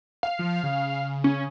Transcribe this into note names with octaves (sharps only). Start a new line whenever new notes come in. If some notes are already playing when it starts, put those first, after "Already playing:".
F5
F3
C#3
C#4